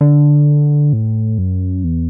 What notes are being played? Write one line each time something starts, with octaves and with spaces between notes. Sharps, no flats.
D3
A2
F#2
E2